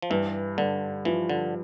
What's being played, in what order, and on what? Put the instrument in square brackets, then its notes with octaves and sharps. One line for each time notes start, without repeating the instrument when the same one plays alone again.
[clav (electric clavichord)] F3
[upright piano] G2 [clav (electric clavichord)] E3
[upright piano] G2 [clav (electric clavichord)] D3
[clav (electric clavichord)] E3 [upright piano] F3
[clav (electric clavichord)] D3